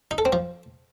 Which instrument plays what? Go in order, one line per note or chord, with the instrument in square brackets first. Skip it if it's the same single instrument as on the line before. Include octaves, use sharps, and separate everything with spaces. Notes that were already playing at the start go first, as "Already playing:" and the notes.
[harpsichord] D#4
A4
C4
F3